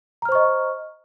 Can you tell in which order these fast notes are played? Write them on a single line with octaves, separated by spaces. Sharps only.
A#5 F6 C5 C#6 D#5